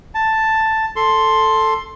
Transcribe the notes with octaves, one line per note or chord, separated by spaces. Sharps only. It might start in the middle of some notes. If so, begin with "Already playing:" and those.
A5
A4 C6